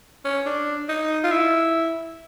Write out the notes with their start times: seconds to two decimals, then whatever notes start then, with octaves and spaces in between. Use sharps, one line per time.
0.25 C#4
0.46 D4
0.89 D#4
1.24 F4
1.31 E4